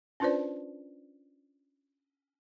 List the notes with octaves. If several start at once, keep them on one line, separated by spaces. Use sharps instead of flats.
C#4 D4 F4 B4 C5 D5